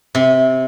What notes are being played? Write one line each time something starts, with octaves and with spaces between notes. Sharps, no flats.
C3